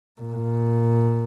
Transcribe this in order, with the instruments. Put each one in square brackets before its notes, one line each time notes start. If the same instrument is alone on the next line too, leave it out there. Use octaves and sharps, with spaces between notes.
[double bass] A#2